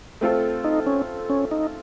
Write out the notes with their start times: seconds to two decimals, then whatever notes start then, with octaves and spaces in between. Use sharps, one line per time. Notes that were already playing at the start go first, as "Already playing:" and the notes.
0.21 A3 C4 F4 A4
0.64 D#4
0.87 C#4
1.30 C#4
1.51 D#4